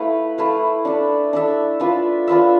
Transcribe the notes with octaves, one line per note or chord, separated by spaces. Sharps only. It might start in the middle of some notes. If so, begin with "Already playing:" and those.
Already playing: A3 E4 B4 F5
A3 E4 B4 F5
D4 A4 E5
D4 A4 E5
D4 F4 B4 E5
D4 F4 B4 E5